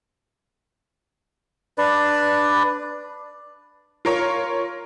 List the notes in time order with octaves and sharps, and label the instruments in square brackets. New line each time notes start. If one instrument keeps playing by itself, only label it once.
[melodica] D4 B4 D5
[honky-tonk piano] F4 A#4 C#5